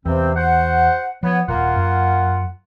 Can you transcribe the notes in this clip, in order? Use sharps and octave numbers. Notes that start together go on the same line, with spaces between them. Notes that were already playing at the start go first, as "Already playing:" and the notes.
E2 G2 C3 C4
F#4 C5 F#5
F3 B3 C#5
D#1 A#3 F4 F#5
F#2